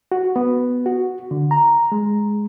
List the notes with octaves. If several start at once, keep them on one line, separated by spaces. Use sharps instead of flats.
F#4
B3
F#4
D3
A#5
G#3